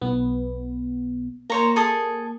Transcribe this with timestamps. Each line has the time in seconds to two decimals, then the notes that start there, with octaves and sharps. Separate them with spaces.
0.02 B1 B3
1.50 A#3 C5 C#5 A#5
1.76 G#4 A4 D#6